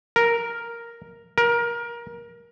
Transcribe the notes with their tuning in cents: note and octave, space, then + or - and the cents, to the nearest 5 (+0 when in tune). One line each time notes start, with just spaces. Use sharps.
A#4 +0
A#4 +20